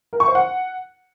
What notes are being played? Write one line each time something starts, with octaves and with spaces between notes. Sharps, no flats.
A#4
C#6
C5
F#5